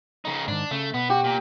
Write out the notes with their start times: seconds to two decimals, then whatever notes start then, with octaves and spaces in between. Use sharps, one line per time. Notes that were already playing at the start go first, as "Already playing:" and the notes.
0.25 C#3 D#4
0.48 G#2 D#3 D4
0.71 C#3 A3
0.94 B2 B3
1.10 F#4 G4
1.24 A#2